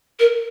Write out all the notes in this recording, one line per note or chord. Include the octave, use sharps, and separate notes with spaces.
A#4